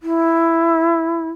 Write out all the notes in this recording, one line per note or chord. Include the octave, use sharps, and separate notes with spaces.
E4